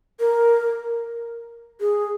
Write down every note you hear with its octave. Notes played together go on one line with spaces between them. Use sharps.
A#4
G#4